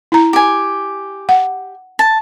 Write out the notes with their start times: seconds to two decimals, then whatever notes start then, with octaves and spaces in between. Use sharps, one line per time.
0.12 E4 A#5
0.33 G4 G#5
1.29 F#5
1.99 A5